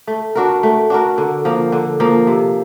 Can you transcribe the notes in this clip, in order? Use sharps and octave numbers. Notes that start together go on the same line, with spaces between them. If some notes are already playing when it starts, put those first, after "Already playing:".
A3
D4 F#4 A#4
A3
D4 F#4 A#4
D3
F3 A#3
D3
F3 A#3
C3